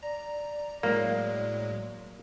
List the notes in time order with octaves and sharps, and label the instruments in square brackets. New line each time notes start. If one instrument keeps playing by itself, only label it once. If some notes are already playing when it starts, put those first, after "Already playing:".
[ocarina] D5 [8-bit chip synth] A#5
[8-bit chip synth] A2 F#3 G#3 [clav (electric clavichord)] A#3